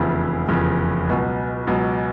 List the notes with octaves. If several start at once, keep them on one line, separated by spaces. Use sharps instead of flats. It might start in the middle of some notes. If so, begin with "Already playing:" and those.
Already playing: F1 E2 C#3 F3
F1 E2 C#3 F3
C#2 B2 F#3
C#2 B2 F#3